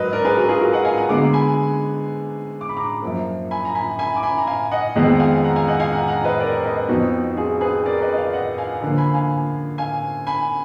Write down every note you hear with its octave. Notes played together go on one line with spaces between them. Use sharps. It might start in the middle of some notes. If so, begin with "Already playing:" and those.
Already playing: G#2 F#3 A#4 B4 D#5
A#4 D5
G#4 B4
F#4 A#4
F4 G#4
F#4 A#4
D#5 F#5
F5 G#5
F#5 A#5
D3 G#3 B3 A#5 D6
G#5 B5
D6
B5
A#5 D6
F#2 F3 A#3
G#5 B5
A#5
G#5 B5
G#5 B5
D6
G#5 B5
A#5
F5 G#5
D#5 F#5
F2 D#3 G#3 B3 D#5 F#5
F#5
F5 G#5
F#5 A#5
F5 G#5
D#5 F#5
F5 G#5
F#5 A#5
F#5 A#5
B4 D#5
A#4 D5
B4 D#5
F2 F3 B3 D#4 F#4
F4 G#4
G#4 B4
A#4 D5
B4 D#5
D#5
D5 F5
D#5 F#5
F5 G#5
D3 F3 A#3
G#5 B5
F5 G#5
F5 G#5
G#5 B5